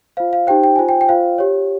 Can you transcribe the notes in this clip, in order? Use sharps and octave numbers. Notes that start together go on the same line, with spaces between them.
F4 C5 F5
F5
D#4 G4 C5 G5
G5
F4 C5 G#5
G5
G5
F4 C5 F5
G4 C#5